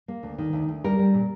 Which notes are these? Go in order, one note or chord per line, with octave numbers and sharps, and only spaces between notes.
A#3
D2
D#3
D2
D2
G3 A#4
G3
A#2